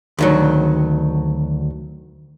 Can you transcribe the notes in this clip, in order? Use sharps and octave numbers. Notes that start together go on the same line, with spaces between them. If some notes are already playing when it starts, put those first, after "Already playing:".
D2 D#3 F#3